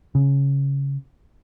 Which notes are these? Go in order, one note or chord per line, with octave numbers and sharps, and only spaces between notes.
C#3